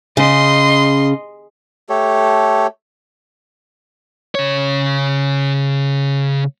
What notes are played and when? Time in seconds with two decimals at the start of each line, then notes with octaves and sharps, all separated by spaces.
0.17 C#3 D#5 C6
1.89 A3 G4 A4 C#5
4.35 C#3 C#5